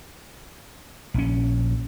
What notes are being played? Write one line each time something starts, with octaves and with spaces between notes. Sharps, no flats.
A#1 C#4